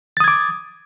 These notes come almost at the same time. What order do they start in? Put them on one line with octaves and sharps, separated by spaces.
A6 D#6 G#6 D6